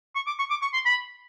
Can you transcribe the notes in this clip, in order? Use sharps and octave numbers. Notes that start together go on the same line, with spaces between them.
C#6
D6
C#6
D6
C#6
C6
B5